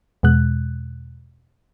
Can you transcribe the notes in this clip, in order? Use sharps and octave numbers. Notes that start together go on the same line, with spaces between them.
E2 B2 G#3 F#6